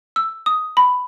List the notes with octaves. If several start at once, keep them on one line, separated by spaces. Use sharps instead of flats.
E6
D#6
B5